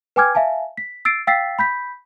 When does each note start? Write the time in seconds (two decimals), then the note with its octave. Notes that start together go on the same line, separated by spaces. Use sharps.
0.16 B4 G5 G#5 D6 F6 G#6
0.35 E5 F5 G#5 A5
0.77 B6
1.05 E6 A6 C7 D7
1.27 F5 G5 E6 A6 B6 C7
1.59 B5 G6 B6